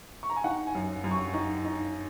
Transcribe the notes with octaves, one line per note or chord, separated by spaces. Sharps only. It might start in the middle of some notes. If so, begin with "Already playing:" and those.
C#6
A#5
G#5
D#4 F#5
G#5
F#2
F#2
C#6
D#4
D#4